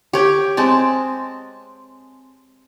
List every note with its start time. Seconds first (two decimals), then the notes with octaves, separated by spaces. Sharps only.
0.13 G4 C#5 G5
0.57 G#3 C4 A5